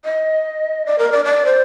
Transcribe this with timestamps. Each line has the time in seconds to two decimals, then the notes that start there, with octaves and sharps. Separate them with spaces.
0.05 D#5
0.86 D5
0.99 A#4
1.12 D5
1.25 D5
1.46 C5